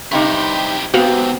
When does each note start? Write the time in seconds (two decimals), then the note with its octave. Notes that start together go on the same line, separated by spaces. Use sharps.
0.12 G2 C3 D#4 E4 G4
0.94 G#2 C3 B3 C4 F#4 F5 F#5